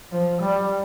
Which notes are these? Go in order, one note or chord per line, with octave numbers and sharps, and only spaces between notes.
F3
G3